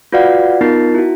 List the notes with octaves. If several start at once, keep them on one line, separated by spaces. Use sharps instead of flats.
F4 F#4 B4 D5 F5 F#5
B3 D#4 F4 A#4 A6 C7
E4 F#4